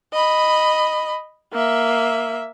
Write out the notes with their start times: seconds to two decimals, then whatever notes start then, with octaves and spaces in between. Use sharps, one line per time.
0.13 D#5 B5
1.53 A#3 E5